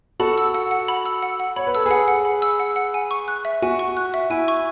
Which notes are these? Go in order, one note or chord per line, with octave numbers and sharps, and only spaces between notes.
F#4 A4 B5
E6
F#5
F#5
B5
E6
F#5
F#5
C#5 B5
B4
A4 E6
G#4 B4
F#5
F#5
B5
E6
F#5
F#5
G#5
C#6
F#6
E5
F#4 G#5
C#6
F#6
E5
E4 G#5
C#6